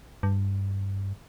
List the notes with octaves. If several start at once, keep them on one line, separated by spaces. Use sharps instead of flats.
G2